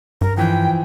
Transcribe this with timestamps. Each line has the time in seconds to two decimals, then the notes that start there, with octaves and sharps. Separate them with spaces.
0.21 G2 A#4
0.37 E3 F3 G5